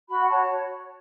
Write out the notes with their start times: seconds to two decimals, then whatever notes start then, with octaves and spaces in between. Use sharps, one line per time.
0.09 F#4 B5
0.20 F#5
0.29 C#5 A5